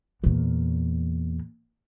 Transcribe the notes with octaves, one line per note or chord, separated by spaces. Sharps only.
E2 A#2